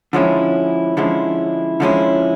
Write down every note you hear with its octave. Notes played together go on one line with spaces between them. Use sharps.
D3 F3 G#3 C#4 E4
D3 F3 G#3 C#4 E4
D3 F3 G#3 C#4 E4